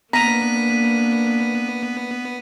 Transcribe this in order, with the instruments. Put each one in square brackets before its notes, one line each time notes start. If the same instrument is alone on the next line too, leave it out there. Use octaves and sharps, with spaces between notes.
[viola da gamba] A#3 D4 [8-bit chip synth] B3 [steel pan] A#5 [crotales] B6 D#7